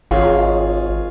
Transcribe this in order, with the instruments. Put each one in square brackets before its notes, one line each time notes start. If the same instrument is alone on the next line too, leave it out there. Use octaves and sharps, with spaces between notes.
[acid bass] G#1 [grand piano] F4 G#4 C#5